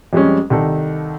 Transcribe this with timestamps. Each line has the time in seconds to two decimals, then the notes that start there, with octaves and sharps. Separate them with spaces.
0.13 F2 G3 G#3 C#4
0.50 C2 D#3 A4